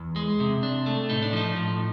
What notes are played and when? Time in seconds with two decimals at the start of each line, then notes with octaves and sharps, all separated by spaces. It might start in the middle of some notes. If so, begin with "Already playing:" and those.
Already playing: E2
0.16 G#3
0.40 C3
0.63 D4
0.86 A3
1.09 A2 D#4
1.23 D4
1.33 F3 D#4
1.57 A2